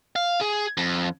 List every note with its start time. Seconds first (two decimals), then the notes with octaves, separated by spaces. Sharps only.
0.16 F5
0.41 G#4
0.77 F2